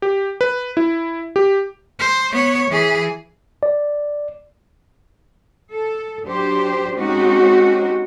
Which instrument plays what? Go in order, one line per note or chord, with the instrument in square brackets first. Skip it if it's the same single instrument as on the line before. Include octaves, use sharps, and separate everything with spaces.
[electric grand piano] G4
B4
E4
G4
[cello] C5
B3 C#5
E3 G#4
[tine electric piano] D5
[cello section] A4
F#3 D4 G4 C5
G#3 C4 C#4 D#4 F#4 G4